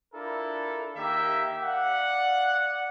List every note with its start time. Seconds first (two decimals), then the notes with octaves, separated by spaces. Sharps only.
0.14 D4 E4 F4 A4 A#4
0.96 D#3 A#3 G4 E5
1.63 D5 F5 F#5